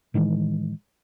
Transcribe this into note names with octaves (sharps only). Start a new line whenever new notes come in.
A2 D#3 E3 G#3